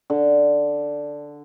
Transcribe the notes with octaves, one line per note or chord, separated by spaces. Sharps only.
D3